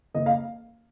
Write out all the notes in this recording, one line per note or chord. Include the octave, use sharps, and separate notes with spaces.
F#1 D#5
F5